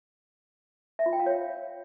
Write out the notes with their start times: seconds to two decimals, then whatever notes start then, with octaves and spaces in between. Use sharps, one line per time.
0.99 E5
1.06 F4
1.13 G5
1.20 F5
1.26 C#5